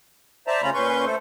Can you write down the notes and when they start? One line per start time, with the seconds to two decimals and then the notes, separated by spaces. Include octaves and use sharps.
0.47 C5 D5 E5 A5 A#5
0.62 C#3 A3 C#4 F4 A#5 B5
0.74 A#2 C#4 B4 C6 C#6 G6
1.05 A3 A4 C5